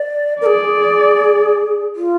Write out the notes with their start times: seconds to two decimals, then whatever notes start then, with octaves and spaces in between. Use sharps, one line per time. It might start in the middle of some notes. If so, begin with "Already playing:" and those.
Already playing: D5
0.41 A#4 D5
0.46 G#4
1.96 F4